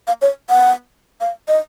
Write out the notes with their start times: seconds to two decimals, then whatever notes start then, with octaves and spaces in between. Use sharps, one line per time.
0.07 F5
0.22 C#5
0.50 F#5
1.21 F5
1.48 D#5